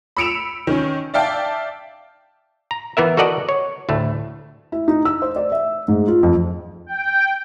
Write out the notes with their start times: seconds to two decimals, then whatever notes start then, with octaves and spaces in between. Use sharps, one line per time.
0.17 B5 E6 C#7 D7 E7 F7
0.67 D#3 C#4
1.14 D5 E5 F5 G5 A5
2.71 A#5
2.97 E3 B3 A#4 E5
3.17 F#4 A4 A#4 D5 D#5 F#5
3.49 C#5
3.89 D2 A2 A3
4.72 E4
4.88 D#4
5.05 E6
5.22 C5
5.36 D5
5.52 E5
5.88 G#2
6.08 F4
6.23 F2
6.86 G5